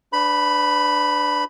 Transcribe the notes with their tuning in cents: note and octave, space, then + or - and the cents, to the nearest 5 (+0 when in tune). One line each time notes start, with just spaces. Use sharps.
D4 +0 B4 +40 B5 +0